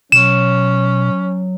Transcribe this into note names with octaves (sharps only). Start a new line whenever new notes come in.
B2 F#3 C#4 E7